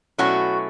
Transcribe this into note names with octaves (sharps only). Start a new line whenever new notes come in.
B2 F#3 A3 C#4 E4 F#4